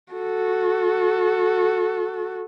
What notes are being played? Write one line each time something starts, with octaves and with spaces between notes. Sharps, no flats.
F#4 A4